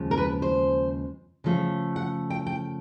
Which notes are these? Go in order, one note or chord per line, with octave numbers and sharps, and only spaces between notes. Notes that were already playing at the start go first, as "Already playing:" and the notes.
Already playing: D#2 C#3 F3 G#3
A#4
B4
C5
C#3 F3 A3
F#5
G5
G5